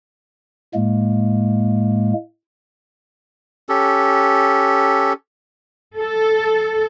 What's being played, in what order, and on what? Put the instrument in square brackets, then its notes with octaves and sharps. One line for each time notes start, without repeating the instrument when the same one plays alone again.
[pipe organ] A2 G#3 A#3
[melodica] C#4 G4 A4
[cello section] A4